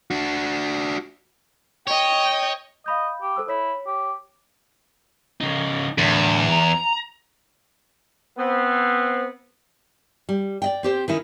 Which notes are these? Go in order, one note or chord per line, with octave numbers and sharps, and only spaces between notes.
D4 F#4
C#5 D#5 G5
D#5 F5 B5 G6
G4
A4 C5 E6
E4 C#5 B6
G4
C#3 D#4
E2 A2 D3
A#5
B3 C4
G3
D5 D#5 G5
C4 G4 C5
D#3 C#4 D#4 E4